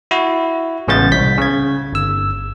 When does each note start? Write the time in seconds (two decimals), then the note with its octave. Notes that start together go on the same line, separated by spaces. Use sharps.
0.11 E4 F#4
0.88 A1 C#3 G#3 B3 G6 A6
1.11 C2 G6 B6
1.38 C#3 G#6
1.93 G1 E6